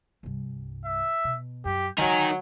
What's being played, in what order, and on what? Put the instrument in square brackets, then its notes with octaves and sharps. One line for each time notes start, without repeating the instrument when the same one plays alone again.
[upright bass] C2 G2
[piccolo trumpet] E5
[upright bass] B2
[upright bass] F#2 [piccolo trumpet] G4
[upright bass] D3 G#3 [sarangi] F#3 [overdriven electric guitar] D#4 A#4 [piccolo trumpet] G#5